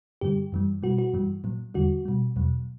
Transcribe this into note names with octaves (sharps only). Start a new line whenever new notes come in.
G2 D3 G3 G4
F#2 E3 G3
B2 G3 F#4
F#4
G2 E3 G3
A#2 F#3
E2 D3 G3 F#4
B2 G3
E2 B2 F#3